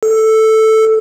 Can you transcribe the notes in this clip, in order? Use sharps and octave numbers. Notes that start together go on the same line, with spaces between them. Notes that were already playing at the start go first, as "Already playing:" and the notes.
A4